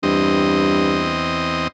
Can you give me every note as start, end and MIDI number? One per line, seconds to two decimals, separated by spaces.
0.03 1.68 40
0.03 1.16 43
0.03 1.68 60
0.03 1.68 75